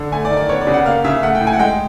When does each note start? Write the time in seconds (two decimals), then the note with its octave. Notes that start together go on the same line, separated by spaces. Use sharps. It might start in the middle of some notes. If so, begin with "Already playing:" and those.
Already playing: D3
0.12 A3 G#5
0.25 D5
0.31 D#3
0.37 D5
0.49 B3 C#5
0.61 D5
0.67 C#3
0.74 F#5
0.86 A#3 F5
1.04 C#3 E5
1.23 A3 F#5
1.35 G5
1.41 A2
1.47 G#5
1.53 F#5
1.59 G#3 G5